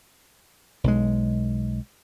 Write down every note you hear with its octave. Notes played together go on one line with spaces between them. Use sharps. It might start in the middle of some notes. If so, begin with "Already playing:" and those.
B1 G#3